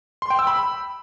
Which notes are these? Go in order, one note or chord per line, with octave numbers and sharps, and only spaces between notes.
C6
G5
E6
B5